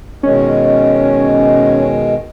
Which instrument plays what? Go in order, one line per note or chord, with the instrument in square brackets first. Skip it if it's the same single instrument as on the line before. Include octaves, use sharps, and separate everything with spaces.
[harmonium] B2 D#3 G#3 [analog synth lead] C#4